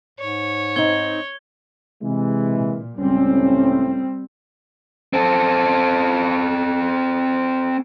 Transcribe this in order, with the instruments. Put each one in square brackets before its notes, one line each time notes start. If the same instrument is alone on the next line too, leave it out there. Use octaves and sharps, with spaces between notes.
[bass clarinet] G#2 [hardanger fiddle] C#5
[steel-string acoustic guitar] C4 D#4 [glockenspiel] G#6 G7
[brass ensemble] C3 E3 G#3
[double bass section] A#2
[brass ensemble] C#2 A2 C#4 [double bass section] G3 C4
[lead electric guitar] C4 A4